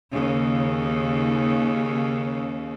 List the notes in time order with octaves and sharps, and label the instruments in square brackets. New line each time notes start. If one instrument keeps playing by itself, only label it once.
[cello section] D#2 C#3